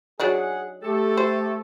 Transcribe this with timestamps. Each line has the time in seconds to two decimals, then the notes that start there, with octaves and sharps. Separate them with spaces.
0.20 F#3 D4 D#4 G#4 F#5
0.83 A3 G4 A4
1.17 C5